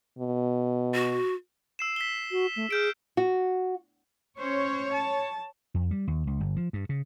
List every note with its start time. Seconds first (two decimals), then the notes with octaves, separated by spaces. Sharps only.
0.19 B2
0.94 F#4
1.79 E6 C7 E7
1.96 B6 G7
2.32 F#4
2.56 A3
2.71 G#4 F6 G6 D7
3.17 F#4
4.39 C#4 C5 C#5
4.93 A5
5.74 F2
5.91 G3
6.07 D#2
6.27 C#2
6.40 G1
6.56 F3
6.73 G2
6.89 C#3